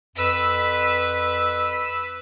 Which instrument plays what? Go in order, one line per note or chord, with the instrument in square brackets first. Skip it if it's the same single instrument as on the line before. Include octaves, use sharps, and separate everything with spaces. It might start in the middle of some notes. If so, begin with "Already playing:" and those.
[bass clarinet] F2 [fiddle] B4 [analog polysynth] E6 B6